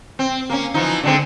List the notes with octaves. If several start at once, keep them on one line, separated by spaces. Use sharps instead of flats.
C4
A#3 C#4
E3 F3 D#4
D3 G#3 C4